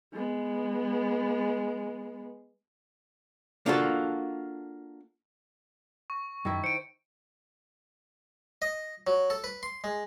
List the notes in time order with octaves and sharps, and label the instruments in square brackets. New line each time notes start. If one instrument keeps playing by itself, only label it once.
[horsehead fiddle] G#3 B3
[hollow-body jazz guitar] A#3 D4 F4 F#4 A4
[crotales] C#6
[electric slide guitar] F#2 [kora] D#3 E4
[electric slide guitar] C5 [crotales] C#7 D7
[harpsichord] D#5
F#3
A4
B4
C6
G#3